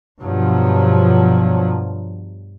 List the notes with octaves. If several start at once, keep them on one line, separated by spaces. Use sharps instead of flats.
G2 B2 F3 F#3